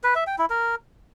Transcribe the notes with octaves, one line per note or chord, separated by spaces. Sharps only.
B4
E5
G5
E4
A#4